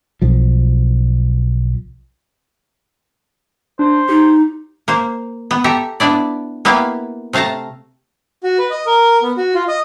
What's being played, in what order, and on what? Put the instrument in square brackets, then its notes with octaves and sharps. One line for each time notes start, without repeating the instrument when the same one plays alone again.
[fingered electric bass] B1 F3
[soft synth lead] D4 [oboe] C5
[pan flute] D#4 [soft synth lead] G4
[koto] A#3 C5
B3
G4 A4 E5 A#5
B3 D4 E4 D5
A#3 B3 E4 G4 F5
C3 A3 F5 A5 A#5
[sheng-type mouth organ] F#4
B4
D#5
A#4
B3
F#4
F4
D#5